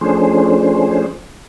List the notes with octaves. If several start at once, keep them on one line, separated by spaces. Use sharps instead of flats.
F3 A3 C#4 D4 G#4 C5